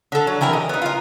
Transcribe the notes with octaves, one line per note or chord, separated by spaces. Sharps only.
D3 A4
F#3
E3 G4 A#4 E5
D#5
B3 D#4
F4 A#4